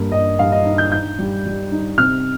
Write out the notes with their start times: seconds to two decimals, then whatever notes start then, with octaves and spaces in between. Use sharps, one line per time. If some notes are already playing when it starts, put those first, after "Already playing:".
Already playing: G2 A#3
0.12 G2 D#5
0.39 G2 F5
0.52 D#5
0.65 D#4
0.78 G6
0.92 D#4 G6
1.19 G3
1.46 G3
1.71 D#4
1.98 C3 F6